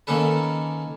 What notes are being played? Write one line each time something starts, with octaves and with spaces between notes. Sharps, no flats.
D#3 A#3 C#4 A4 B4